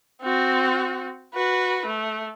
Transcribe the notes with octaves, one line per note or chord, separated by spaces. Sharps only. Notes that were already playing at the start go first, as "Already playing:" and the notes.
C4 F#4
F#4 B4
A3